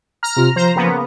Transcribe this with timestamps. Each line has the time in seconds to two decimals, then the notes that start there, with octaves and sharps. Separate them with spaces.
0.23 A#5 F6
0.37 C3 F4
0.56 F3 C5 A#5
0.76 C#3 A#3 B3